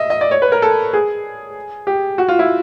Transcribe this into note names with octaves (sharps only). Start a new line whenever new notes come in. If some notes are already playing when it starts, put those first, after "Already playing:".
Already playing: D#5 E5
D#5
D5
C#5
B4
A#4
A4
G#4
G4
F#4
F4
E4